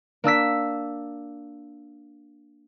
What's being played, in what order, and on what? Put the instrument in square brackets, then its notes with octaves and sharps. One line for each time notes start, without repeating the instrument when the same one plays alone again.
[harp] A#3 D4 E6 B6